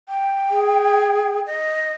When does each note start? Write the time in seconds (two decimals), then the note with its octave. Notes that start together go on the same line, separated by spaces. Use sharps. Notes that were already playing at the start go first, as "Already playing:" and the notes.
0.08 G5
0.51 G#4
1.46 D#5